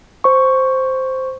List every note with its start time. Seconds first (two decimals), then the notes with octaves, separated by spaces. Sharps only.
0.24 C5 C#6